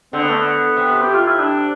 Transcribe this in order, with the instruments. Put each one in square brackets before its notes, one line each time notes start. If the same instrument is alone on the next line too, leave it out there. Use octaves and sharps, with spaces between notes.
[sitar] D3 [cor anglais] C4
[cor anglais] B3
A3
B3
[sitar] C3
[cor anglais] G4
F4
E4
D4